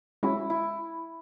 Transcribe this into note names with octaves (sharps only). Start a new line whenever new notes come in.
G#3 C#4 E4 F#4
E4